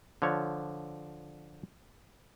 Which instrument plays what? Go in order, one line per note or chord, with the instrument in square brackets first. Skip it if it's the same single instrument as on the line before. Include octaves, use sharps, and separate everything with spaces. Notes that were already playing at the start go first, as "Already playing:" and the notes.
[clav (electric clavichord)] D3 F3 C#5